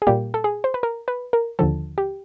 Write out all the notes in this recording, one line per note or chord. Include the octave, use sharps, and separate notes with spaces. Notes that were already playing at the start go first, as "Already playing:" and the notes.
G#4
A#2 G3 A#3 G4
A4
G#4
C5
B4
A#4
B4
A#4
D#2 D3 F3 A4
G4